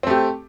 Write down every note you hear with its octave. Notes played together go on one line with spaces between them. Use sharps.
A3 C4 G4